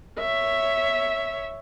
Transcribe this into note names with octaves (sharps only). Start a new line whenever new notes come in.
C#5 E5